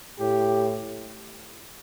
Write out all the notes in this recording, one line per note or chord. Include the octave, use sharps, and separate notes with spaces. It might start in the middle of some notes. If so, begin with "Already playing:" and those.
A2 G4